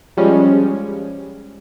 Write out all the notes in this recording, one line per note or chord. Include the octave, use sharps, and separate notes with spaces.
F3 G3 G#3 C#4